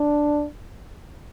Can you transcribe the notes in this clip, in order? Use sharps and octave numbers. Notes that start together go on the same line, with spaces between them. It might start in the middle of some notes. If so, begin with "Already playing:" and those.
Already playing: D4